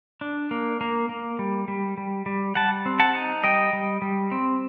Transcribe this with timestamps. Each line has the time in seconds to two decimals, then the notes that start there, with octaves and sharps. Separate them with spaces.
0.21 D4
0.51 A#3
0.81 A#3
1.09 A#3
1.39 G3
1.68 G3
1.97 G3
2.26 G3
2.55 G3 F#5 A5
2.86 C4
3.00 F#5 A5
3.15 D#4
3.44 G3 D#5 G5
3.73 G3
4.02 G3
4.32 C4